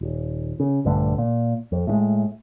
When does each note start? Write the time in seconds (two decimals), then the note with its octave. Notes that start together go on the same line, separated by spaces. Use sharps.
0.01 D#1
0.60 C#3
0.85 A#1 G2 D3 A3
1.18 A#2
1.72 F2
1.87 A2 C3 G#3